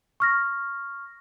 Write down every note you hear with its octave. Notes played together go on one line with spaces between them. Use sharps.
C#6 F6 A#6